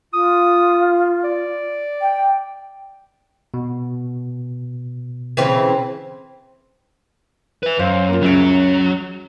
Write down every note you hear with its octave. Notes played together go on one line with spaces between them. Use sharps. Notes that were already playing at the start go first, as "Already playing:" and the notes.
F4 D#6
D5
G5
B2
C#3 E3 C4
B4 E5
F#2 C5 F5
A#3 F4
C#2 F#2 F#3 D7